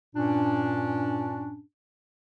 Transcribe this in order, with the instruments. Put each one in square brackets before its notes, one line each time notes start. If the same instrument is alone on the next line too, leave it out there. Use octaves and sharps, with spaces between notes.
[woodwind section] G2 A#2 C#4 D4